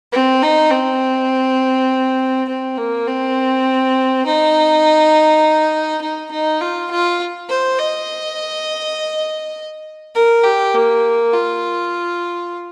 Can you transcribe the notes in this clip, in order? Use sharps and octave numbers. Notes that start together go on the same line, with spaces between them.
C4
D#4
C4
C4
A#3
C4
D#4
D#4
D#4
F4
F4
C5
D#5
A#4
G4
A#3
F4